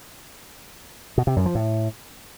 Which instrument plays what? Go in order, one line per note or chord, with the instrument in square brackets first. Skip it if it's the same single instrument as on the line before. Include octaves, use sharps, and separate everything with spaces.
[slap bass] B2
C3
F#2
F3
A2